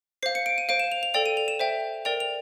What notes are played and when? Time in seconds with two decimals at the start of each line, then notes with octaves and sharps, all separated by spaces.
0.23 C5 F5 C7
0.35 C#7
0.46 D7
0.58 D#7
0.69 C5 F5 D7
0.80 E7
0.92 F7
1.03 F7
1.14 A4 D5 G5 F7
1.26 D#7
1.37 F7
1.48 E7
1.59 C5 E5 G5
2.05 A#4 D5 G5 F7
2.20 F7